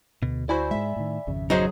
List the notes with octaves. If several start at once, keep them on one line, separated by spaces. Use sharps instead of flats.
D2 B2
E4 F#4 C5 D5 G#5 B5
G#2 G#3 E5
A2 D#3
G#1 F2 C#3
F#3 D#4 F#4 G#4 C5